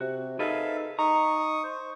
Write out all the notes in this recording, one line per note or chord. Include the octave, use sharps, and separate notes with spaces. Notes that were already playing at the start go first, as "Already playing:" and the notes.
C3 F#4
D#4 G#4 A4 B4 E5 F5
D#4 A#5 C#6 D#6
C5